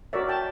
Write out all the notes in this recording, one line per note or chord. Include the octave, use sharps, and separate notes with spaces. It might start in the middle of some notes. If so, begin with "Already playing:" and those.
F#4 A#4 C#5 D5 E5
G5 A5